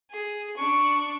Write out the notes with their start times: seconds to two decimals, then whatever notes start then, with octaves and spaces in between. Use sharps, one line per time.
0.11 G#4
0.57 D4 C#6